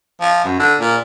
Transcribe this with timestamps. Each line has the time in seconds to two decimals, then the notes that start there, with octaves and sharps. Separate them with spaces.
0.21 F3
0.44 F#2
0.59 D3
0.80 A#2